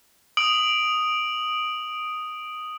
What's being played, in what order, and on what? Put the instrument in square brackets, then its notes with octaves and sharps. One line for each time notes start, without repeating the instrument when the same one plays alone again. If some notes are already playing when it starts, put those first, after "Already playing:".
[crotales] D#6 D7 F#7